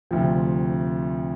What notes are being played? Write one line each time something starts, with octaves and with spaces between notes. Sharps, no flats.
D2 C3 F3 C4